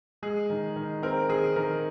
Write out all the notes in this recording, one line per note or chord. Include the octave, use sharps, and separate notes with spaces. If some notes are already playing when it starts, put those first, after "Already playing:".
G#3 G#4
D#3
D#3
C4 A#4
D#3 G#4
D#3 A#4